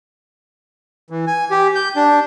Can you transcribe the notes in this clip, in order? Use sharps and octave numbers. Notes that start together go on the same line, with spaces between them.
E3
G#5
G4
G6
D4